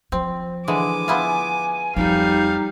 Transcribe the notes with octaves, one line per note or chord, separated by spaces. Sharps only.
F3 C4
D3 E3 G#3 G#5 D6
B3 E4 F4
F2 G3 D#4 F5